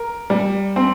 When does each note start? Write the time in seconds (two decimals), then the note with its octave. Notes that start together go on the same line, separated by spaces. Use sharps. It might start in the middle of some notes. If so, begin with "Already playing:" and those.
Already playing: A#4
0.30 G3
0.76 C4